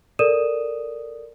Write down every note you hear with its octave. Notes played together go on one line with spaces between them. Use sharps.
A4 A#4 D5 D#6 D#7 E7